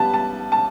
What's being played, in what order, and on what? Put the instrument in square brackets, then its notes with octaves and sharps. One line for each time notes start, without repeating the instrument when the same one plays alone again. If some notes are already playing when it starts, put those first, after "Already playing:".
Already playing: [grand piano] G3 B3 [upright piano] A5
[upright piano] A5
A5